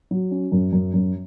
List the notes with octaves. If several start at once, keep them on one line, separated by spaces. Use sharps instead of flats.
F#3
C#4
F#2
F#2
F#2